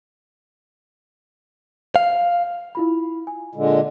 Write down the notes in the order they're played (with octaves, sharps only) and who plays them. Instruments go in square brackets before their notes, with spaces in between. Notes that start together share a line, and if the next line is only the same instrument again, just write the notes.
[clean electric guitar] F5
[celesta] E4 F4 B5
G#5
[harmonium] A#2 D3 G#3